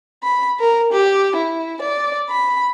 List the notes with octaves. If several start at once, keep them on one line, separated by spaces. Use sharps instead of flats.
B5
A#4
G4
E4
D5
B5